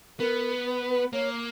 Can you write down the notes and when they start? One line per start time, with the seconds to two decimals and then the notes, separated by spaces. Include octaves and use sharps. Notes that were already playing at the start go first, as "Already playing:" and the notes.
0.19 B3 A#4
0.65 B4
0.89 B4
1.13 A#3 C#5